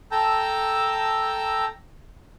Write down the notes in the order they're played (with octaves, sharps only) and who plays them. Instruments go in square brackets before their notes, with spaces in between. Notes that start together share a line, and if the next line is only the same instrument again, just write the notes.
[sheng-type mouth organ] A4 G5 A5 A#5 E6 G6